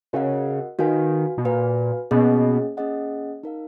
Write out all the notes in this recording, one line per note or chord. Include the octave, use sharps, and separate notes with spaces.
C#3 F#4 A#4 D#5 F#5
D#3 F#4 B4 F5 G#5
B2
A#2 F#4 B4 F5 G#5
B2 A#3 C#4 G#4 D#5 F#5
A#3 C#4 G#4 D#5 F#5
D#4 A#4 F5